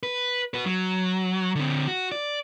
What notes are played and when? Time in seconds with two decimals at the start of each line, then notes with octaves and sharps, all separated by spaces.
0.03 B4
0.54 F#4 B4
0.66 F#3
1.55 D3 C4
1.88 F#4
2.12 D5